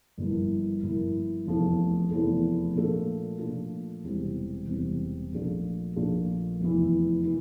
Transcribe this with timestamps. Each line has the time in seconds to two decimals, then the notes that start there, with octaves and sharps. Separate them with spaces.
0.17 G1 G2 F3 A#3 E4
0.82 G1 G2 F3 A#3 E4
1.47 F1 E2 C3 F3 A3
2.11 F1 E2 C3 F3 A3
2.75 A#2 F3 A3 D4 F4
3.39 A#2 F3 A3 D4 F4
4.04 E1 E2 C3 G3 C4
4.67 E1 E2 C3 G3 C4
5.32 A#1 A#2 A3 D4 F4
5.96 A#1 A#2 A3 D4 F4
6.60 F1 E2 E3
7.25 E3